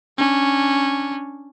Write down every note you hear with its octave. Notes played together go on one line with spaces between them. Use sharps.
C#4 D4